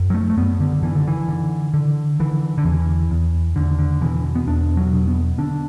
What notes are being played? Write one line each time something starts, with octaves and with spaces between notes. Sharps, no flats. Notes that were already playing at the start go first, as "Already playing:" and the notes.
Already playing: F#2
F#3
A3
A3
F#2 B3
D3
D3 E3
D3
E3
D3
D3
D3 E3
D3
E2 E3
E2
E2 D3
D3
B2 E3
B3
E2 D4
F#3
B2
B3
D3 D4